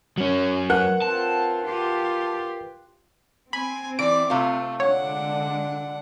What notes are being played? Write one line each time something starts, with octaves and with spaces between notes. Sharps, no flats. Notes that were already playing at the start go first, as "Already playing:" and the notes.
F#3 C#4
A#4 B4 F#5 F#6
C4 F4 A5
F4 G4
C4 G#5 B5
E3 D5 D6 D7
C3 A3 F4
D3 G#3 D4 C#5 F#5